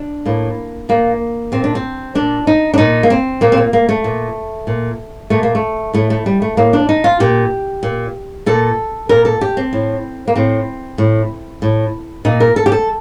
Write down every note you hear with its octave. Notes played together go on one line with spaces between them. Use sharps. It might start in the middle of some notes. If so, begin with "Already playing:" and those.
Already playing: D4
A2 A#3
A#2 A#3
A#2 C4
D4
C4
A#2 D4
D#4
D4
A#2 D#4
A#3
C4
A#2 A#3
C4
A#3
A#3
A3
A#2
A#2
A#2 A3
A#3
A3
A2 A3
A3
G3
A3
A2 A#3
D4
D#4
F4
A#2 G4
A#2
A#2 A4
A#2 A#4
A4
G4
C4
A2
A#3
A2 C4
A2
A2
A#2 D#4
A#4
A4
G4
A4